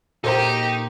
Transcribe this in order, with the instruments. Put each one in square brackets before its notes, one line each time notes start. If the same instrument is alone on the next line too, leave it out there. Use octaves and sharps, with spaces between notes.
[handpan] A#2 A#4 [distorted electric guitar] D#4 [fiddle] G4 [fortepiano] A4 C5 A#5